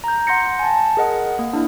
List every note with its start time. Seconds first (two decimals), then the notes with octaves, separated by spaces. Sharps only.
0.04 A#5 G6
0.27 F#5 C6 G6 A#6 C#7
0.59 G#5 A5
0.97 G#4 A#4 D#5 F#5
1.39 A#3
1.53 D4 E4